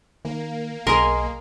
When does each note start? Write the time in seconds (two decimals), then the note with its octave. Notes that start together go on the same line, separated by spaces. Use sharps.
0.25 D#3 A#3
0.87 B1 G#4 A#4 D#5 C6